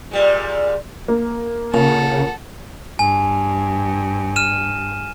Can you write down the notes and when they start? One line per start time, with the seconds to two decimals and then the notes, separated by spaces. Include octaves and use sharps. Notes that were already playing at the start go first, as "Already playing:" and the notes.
0.11 A#2 G3 G#3
1.08 A#3
1.74 A#2 C#3 A4 F#5
2.99 G2 G#5
4.36 F6 D#7 E7